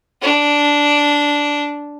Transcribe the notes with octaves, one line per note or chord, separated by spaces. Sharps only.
D4